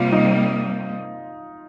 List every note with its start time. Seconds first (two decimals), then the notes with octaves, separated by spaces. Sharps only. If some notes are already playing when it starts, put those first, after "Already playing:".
Already playing: C3 G3 A#3 F4
0.12 D#4